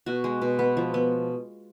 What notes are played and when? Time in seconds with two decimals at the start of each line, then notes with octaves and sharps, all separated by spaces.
0.06 B2 F#4
0.24 G#3
0.41 B2
0.59 B3
0.77 F3
0.94 B3